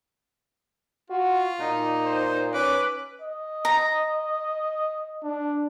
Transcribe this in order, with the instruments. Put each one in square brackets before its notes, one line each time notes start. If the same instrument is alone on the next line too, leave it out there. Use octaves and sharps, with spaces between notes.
[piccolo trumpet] F4 [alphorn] F#4
[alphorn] A#2 [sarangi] D#4
[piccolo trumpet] C5
[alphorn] C#4 [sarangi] B4 [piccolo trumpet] D6
[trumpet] D#5
[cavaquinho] A#5
[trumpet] D4